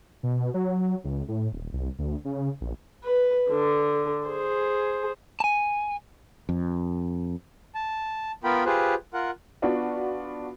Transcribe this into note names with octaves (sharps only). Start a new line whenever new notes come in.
B2
F#3
C#2
A2
D#1
C2
D2
C#3
A#1
B4
D3
G#4 C5
G#5 A5
F2
A5
B3 F4 A#4 G5 B5
F4 G4 G#4 B4 C5
F4 A#4 F#5
B3 D4 F4 F#4